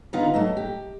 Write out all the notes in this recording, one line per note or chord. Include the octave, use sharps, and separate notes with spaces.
D3 B3 D#4 F4 A#5
F#3 A3 D#5
G4